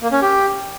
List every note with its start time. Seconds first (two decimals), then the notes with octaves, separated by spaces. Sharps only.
0.01 A#3
0.11 C#4
0.22 G4